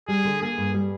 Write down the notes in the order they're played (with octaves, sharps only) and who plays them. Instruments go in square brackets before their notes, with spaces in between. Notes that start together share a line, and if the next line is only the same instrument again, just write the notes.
[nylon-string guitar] G3 [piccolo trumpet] G#4
[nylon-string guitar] D3
[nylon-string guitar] A#3 [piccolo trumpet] G#4
[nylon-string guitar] G2
G3